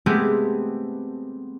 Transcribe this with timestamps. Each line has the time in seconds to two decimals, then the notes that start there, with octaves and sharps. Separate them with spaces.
0.06 G#3 A3 B3 C4 G4 G#4